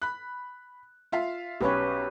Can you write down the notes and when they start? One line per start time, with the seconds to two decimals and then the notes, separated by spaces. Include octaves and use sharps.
0.02 B5 F#6
1.12 F4 E5 F5
1.61 B1 C#4 G4 B4 C#5